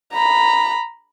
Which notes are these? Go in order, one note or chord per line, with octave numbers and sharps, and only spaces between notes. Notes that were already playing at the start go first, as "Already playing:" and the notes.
A#5 B5